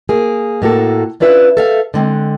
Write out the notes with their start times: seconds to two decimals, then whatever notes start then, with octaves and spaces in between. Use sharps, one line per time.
0.09 A#3 G#4
0.62 A2 A#3 F#4 A4
1.20 C#4 D4 F4 B4 E5
1.57 A4 E5 F5
1.94 D3 G#3 C4